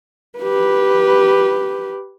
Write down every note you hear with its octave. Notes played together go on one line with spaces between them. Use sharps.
G4 B4